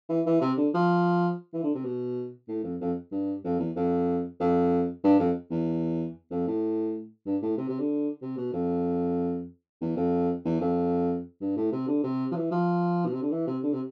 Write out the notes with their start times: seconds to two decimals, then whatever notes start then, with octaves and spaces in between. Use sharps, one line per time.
0.09 E3
0.26 E3
0.41 C3
0.57 D3
0.74 F3
1.53 E3
1.63 D3
1.75 C3
1.85 B2
2.48 A2
2.64 F2
2.80 F2
3.12 G2
3.44 F2
3.59 E2
3.76 F2
4.40 F2
5.04 G2
5.19 F2
5.51 E2
6.31 F2
6.47 A2
7.26 G2
7.42 A2
7.57 C3
7.69 C3
7.79 D3
8.22 C3
8.37 B2
8.53 F2
9.81 E2
9.96 F2
10.45 E2
10.61 F2
11.41 G2
11.56 A2
11.72 C3
11.87 D3
12.03 C3
12.31 F3
12.36 E3
12.51 F3
13.05 B2
13.13 C3
13.22 D3
13.32 E3
13.47 C3
13.63 D3
13.73 C3